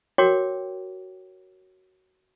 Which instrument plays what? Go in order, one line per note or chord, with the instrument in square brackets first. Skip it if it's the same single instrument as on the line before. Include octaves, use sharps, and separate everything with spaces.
[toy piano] F#4 A#4 C#5 G5 D6